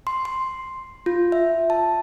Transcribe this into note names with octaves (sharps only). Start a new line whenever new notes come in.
C6
C6
F4
E5
A5